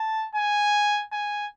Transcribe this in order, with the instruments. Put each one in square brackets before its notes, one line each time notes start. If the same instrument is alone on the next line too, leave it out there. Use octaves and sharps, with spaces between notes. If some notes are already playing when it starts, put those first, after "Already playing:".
Already playing: [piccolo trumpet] A5
G#5
G#5